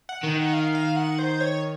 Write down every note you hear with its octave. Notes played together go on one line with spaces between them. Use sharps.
F#5
D#3
F5
F5
F#5
C5
C#5